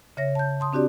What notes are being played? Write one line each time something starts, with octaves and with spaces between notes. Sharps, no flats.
C#3 C#5 E5 A#6
A5 G6
A5 C6 D#6
C4 D4 F#4 G4 D5